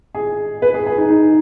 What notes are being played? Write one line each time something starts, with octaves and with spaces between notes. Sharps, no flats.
G#4
B4
G#4
G#4
D#4
D#4